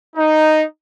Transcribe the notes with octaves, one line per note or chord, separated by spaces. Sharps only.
D#4